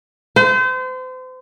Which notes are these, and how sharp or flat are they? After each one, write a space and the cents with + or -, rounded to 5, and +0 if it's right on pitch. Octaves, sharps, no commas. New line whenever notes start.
C5 -35